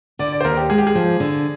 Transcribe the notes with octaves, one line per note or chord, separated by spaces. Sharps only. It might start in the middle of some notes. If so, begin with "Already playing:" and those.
D3 D5
D5
C5
D#2 A#4
G4
G#3 G#4
G4
G#4
F3
D3